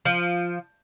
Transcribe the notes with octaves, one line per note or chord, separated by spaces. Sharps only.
F3